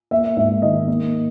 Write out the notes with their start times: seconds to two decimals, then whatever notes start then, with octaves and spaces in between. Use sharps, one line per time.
0.11 A#3 E5
0.36 G#2 E5
0.62 D#3 D#5
0.88 A#3